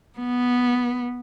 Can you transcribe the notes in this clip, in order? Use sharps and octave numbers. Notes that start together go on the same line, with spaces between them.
B3